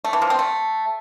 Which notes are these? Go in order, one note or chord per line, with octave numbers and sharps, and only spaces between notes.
A3
E3
F3
C4
A3